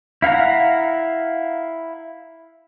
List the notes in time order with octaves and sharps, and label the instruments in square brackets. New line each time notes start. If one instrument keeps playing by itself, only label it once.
[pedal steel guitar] E4 F5 F#5 A#5